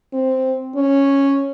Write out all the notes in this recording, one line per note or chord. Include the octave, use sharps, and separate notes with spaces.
C4
C#4